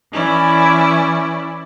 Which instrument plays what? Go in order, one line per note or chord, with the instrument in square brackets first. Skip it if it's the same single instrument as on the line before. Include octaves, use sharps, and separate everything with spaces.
[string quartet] E3 C#4 E4 D5